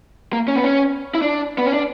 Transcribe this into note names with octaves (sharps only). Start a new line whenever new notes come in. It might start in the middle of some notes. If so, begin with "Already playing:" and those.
A#3
C#4
B3
C#4
E4
D4
B3
C#4
D4